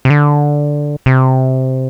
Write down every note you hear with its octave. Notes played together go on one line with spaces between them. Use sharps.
C3
D3
C3